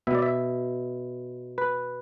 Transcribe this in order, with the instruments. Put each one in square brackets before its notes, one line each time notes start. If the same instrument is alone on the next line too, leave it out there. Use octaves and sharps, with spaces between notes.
[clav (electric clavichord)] B2 B3 E5
D5
E5
B4